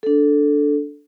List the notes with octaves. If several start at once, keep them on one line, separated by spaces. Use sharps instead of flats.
D4 A4